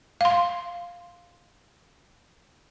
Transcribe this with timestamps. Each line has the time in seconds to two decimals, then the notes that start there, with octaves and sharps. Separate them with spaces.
0.21 F5 C6